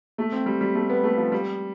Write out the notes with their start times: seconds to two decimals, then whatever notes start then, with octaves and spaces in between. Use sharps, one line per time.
0.18 A3
0.32 C4
0.46 G3
0.61 G3
0.75 A3
0.89 B3
1.03 A3
1.17 F3
1.32 G3